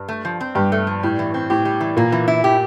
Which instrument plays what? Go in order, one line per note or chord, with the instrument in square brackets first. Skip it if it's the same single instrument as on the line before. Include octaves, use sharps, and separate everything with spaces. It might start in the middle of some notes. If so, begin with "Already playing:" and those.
Already playing: [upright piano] G2
[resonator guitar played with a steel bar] A3
F3
C4
[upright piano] G2 [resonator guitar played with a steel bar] G4
[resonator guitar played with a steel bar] A3
F3
[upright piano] A2 [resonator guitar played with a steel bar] G3
[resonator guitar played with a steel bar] E3
C4
[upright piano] A2 [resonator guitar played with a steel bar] G4
[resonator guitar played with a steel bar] G3
E3
[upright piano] A#2 [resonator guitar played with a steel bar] A#3
[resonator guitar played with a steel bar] E3
E4
G4